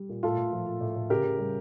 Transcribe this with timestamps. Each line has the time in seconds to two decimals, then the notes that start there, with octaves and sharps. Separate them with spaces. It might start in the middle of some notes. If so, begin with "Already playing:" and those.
Already playing: G3
0.09 A#2
0.23 A2 F4 A4
0.37 A2
0.53 F3
0.67 F3
0.81 A2
0.95 A2
1.10 C#3 G4 A#4
1.24 C#3
1.39 G3